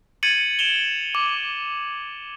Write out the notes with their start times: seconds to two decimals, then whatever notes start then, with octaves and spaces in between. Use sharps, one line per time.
0.23 G#6 A6 C#7 D#7 F#7
0.59 D7 E7 F7 G7
1.15 D6